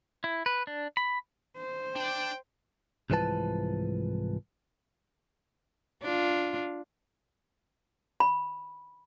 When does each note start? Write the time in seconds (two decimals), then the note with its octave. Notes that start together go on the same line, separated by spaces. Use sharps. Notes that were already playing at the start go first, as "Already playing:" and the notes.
0.24 E4
0.46 B4
0.67 D4
0.97 B5
1.58 C5
1.96 D4 D5 G5
3.10 C2 G#2 E3 F3 B4 A5
6.03 D4 F4
8.20 B5